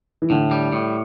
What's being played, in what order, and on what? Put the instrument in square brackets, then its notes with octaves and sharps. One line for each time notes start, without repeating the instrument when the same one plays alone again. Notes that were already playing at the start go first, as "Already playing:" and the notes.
[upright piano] E3
[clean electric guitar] A2 [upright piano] D3
[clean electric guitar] G3
A2